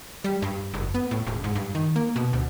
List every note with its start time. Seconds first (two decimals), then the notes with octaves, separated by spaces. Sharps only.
0.24 G3
0.42 G2
0.74 F#1
0.95 B3
1.11 A2
1.27 E1
1.44 G#2
1.56 G2
1.75 D#3
1.96 A#3
2.16 B2
2.33 D2